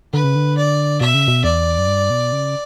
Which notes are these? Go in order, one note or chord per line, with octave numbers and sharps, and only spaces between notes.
D3 B4
C#3
D3
D5
B2 E5
C#3
B2
E2 D5
F#2
G2
B2
C#3